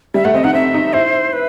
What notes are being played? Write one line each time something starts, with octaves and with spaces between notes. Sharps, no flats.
G3 E5
A3 F#5
C4 D#5
D#4 F#5
C4 E5
D#4
E4 C5
B4